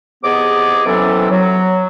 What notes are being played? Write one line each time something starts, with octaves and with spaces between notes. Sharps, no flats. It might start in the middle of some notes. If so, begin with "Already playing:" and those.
E2 C3 B3 G#4 D#5 D6
C3 E3 F#3 B3 C#4 A4
F#3